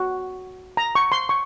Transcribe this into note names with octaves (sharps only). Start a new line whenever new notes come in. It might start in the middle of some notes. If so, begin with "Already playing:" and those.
Already playing: F#4
A#5
C#6
C6
C#6